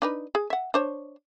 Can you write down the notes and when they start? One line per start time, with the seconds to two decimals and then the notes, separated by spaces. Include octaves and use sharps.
0.02 D4 D#4 B4
0.35 G#4
0.50 E5 F#5
0.74 D4 C5 C#5